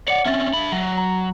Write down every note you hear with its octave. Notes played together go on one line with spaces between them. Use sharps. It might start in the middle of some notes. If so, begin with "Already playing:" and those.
C#5 D5 F#5 C#7
C4 C#4 E5 A6
D4 B5
F#3
A#5